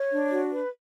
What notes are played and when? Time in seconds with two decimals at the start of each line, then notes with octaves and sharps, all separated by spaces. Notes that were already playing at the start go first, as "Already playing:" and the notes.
Already playing: C#5
0.12 D4
0.32 F#4
0.52 B4